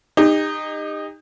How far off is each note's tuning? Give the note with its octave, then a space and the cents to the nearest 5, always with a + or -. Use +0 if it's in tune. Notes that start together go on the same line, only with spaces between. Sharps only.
D#4 -15 G4 +40